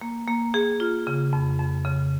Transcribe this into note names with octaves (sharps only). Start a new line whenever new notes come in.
A#3
A#3
G#4
F4
C#3
F2
F2
C#3